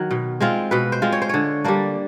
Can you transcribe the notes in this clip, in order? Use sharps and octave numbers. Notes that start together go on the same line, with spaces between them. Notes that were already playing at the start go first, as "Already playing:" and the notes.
Already playing: D#3 F#3
B2
G#3 C4 F4
B2 B4
C5
G#3 C4 F4
C#5
C5
D3 C#5
G3 A#3 D4